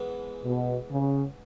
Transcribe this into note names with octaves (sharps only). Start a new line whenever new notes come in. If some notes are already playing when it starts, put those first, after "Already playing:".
Already playing: G#2 E3 G#3 B3
B2
C#3